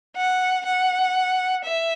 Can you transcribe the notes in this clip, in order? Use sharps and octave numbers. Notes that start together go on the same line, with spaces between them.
F#5
F#5
E5